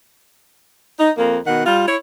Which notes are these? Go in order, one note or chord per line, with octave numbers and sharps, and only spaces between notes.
D#4
F2 A#3
B2 D#3 F#5
G3 F4
E4 C#5